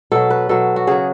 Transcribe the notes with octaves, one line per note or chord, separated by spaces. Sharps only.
B2 F#3 A4
B4
B2 F#3 A4
F#4
C#3 F#3 G#4